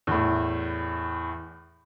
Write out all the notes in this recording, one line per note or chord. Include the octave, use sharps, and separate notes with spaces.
E2 A2